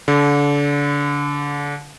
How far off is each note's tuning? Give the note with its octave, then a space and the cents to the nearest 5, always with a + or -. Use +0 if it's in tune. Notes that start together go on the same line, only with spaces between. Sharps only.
D3 -30